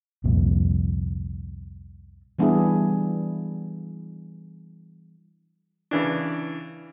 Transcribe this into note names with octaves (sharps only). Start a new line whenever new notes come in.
C2 F2 A#2
E3 G3 B3 D4 E4 G#4
C#3 E3 D4